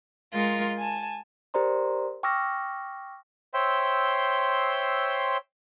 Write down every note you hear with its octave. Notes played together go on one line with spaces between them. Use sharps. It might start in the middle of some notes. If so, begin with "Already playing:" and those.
G#3 F4 A#4
G#5 A5
G4 A#4 C5 D5 A#5 C6
G5 C#6 D6 E6 F6 A#6
C5 C#5 E5 G5 C6 E6